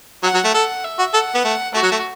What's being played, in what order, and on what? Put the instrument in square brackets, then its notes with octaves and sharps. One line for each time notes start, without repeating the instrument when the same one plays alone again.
[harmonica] F#3 [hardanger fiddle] F#5
[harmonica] F#3
A3
[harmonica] A4 [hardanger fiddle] F#5
[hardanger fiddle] E5
[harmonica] F#4
[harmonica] A4 [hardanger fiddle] F#5
[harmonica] B3
A3
[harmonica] A3 [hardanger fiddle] F#4
[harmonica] F#3
A3